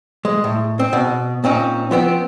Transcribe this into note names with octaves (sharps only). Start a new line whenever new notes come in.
G#3
A2
C4
B2
A#2 C4 C#4 D#4
F3 B3 C4